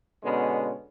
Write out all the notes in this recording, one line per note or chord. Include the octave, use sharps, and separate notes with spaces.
B2 D3 G#3 B3 C#4